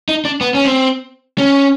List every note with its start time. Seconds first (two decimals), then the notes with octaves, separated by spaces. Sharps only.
0.09 D#4
0.25 D4
0.41 B3
0.54 C#4
0.65 C4
1.38 C#4